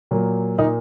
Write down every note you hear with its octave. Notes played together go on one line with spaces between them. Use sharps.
A#2 F#3 A#3
A#2 A#3 D#4